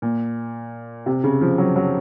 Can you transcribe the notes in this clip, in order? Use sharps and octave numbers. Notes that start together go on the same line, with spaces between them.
A#2
C3
C#3
F3
F#3
F#3